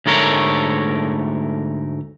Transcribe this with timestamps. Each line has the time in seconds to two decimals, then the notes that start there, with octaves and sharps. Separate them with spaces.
0.06 D2 G#2 A3 A#4 C#5